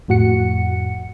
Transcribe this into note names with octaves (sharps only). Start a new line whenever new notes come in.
F2 A2 F#4 F#5 C#7